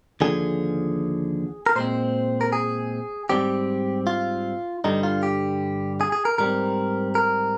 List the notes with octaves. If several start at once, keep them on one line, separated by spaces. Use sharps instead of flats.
D#2 D3 F3 G#4
A#4
A#2 G#3 C4 C5
A#4
G#4
G#2 G3 C4 G4
F4
G2 D3 G3 D#4
F4
G4
G#4
G#4
A#4
G#2 G3 C4 A#4
A#4